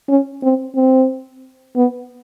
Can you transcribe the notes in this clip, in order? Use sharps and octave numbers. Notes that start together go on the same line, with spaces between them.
C#4
C4
C4
B3